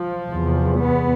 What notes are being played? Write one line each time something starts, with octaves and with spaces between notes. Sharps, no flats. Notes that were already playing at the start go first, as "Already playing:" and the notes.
Already playing: F3
E2 C3
B3